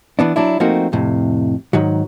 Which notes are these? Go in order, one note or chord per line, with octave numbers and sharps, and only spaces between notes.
E3 B3 D4
F#3 D4 E4
F3 A3 A#3 C4 D#4 F#4
F2 A2 C3
G#2 D#3 F#3